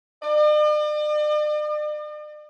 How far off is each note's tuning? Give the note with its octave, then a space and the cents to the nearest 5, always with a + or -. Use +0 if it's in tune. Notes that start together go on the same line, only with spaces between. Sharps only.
D5 +45